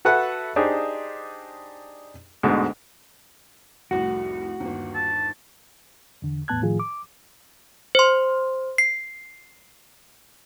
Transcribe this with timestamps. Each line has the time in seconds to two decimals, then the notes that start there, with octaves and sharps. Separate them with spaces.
0.05 F#4 A4 B4 E5 F#5
0.56 D4 D#4 G4 G#4 C5
2.43 D2 G#2 B2
3.91 F1 C2 A2 F#4
4.60 G1 D#2
4.95 A5
6.22 E2 D3
6.48 E2 A2 B3 A5 F#6 G#6
6.62 A2 D#3 F3 F4 G#4
6.80 D6
7.95 C5 C6
8.78 C7